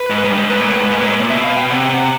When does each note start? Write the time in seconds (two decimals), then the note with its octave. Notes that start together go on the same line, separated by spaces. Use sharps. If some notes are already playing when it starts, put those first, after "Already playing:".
Already playing: B4
0.10 G#2
0.24 G#2
0.30 G2
0.38 G#2
0.50 G#2 B4
0.61 A#2
0.70 A2
0.80 G#2
0.91 G#2
1.00 A#2
1.06 G#2
1.10 A2
1.20 A#2
1.30 B2 E5
1.44 F5
1.57 G5
1.70 C3 F#5
1.90 C3